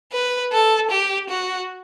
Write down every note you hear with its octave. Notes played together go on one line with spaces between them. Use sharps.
B4
A4
G4
F#4